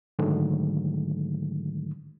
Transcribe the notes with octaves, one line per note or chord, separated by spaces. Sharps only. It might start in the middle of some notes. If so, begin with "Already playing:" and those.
G#2 D3 D#3 F#3 G#3 A3